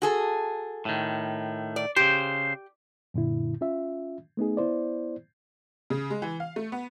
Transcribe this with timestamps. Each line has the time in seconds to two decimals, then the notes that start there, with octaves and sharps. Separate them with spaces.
0.02 F#4 G#4 A4
0.85 A2 D#3
1.76 D5
1.96 C#3 G4 C5
3.14 F#2 A#2 D3 E4
3.61 C#4 F4 E5
4.37 A3 B3 D#4 G#4
4.57 B3 E4 C5 D5
5.90 C#3
6.10 G#3
6.22 E3
6.40 F5
6.56 A3
6.72 B3